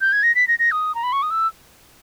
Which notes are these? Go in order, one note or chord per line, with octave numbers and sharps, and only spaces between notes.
G6
G#6
A#6
B6
A#6
A#6
D#6
A#5
B5
C#6
D#6
E6